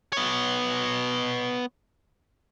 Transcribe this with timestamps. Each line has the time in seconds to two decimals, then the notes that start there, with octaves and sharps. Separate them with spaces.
0.13 B3 C#5